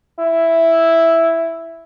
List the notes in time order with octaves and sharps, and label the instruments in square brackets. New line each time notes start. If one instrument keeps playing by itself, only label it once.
[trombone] E4